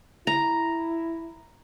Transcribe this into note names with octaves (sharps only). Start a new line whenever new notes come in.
E4 A#5